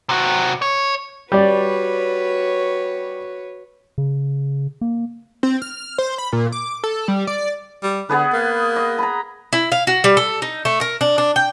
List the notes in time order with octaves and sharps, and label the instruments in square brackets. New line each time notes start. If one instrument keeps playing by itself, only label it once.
[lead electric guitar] C3 F#4
C#5
[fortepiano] G3 D5 [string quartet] F#4 B4 C#5
[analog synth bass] C#3
A#3
[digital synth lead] C4
F6
C5
B5
A#2
D6
A4
G3
D5
[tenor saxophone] G3
[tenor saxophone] D3 [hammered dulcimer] B3 G#4 B4
[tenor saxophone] A#3
[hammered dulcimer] D#5
A#5 B5
[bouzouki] E4
F5
F#4
G3
A4
D#4
A3
A#4
D4
D4
G5